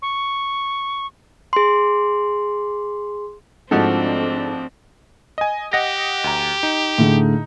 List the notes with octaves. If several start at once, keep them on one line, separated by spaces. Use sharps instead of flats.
C#6
G#4 C6
G#2 F3 A3 C4 D4 F#4 A4
D#5 G#5
G4 D#5 F#5 A#6
D2 A#5
D#4
A2 D3 G#4